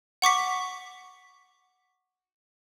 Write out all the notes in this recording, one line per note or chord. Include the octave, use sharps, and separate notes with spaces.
F#5 C#6 D6 B6